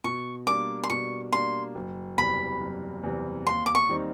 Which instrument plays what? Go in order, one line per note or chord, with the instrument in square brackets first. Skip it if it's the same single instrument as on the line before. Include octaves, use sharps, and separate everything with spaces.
[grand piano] B2 [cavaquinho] C#6
[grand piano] G3 A#3 D4 [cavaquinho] D6
[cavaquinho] C6
[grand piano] B2 [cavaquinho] C#6
[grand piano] G3 A#3 D4 [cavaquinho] C6
[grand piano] F#1
[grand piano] E2 C3 E3 G3 [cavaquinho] B5
[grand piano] F#1
E2 C3 E3 G3
[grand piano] D#2 [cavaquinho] C6
[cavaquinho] D6
C#6
[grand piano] D#3 G3 C4 D#4